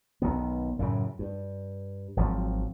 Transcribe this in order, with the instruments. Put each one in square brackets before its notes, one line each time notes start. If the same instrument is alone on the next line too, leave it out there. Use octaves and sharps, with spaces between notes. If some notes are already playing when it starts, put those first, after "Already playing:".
[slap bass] B1 D#3 B3
F#2 A2 C#3
G2
G#1 F3 F#3 C4